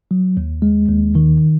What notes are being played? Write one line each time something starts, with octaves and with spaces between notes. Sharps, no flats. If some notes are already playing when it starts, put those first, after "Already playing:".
F#3
D#2
G#3
D#2
D#3